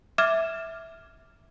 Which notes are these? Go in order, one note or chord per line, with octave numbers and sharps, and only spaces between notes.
E5 D6 F6 G#6 E7